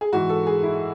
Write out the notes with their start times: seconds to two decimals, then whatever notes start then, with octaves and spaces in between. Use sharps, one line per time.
0.01 G#4
0.12 G#2 E3 F#4
0.29 A4
0.47 G#4
0.63 E4